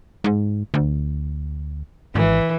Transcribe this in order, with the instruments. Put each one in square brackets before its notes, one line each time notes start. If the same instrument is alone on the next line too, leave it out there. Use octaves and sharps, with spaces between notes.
[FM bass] G#2
D2
[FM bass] G#1 [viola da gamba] E3